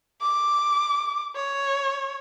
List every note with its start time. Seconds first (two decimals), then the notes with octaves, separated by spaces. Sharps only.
0.22 D6
1.36 C#5